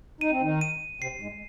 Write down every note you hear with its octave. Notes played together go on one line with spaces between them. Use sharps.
D#4 D#7
C4
D#3 D#4
D#7
C3 C4 C7
G#2 G#3